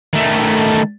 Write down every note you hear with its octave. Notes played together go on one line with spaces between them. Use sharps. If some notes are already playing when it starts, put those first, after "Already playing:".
D#3 A3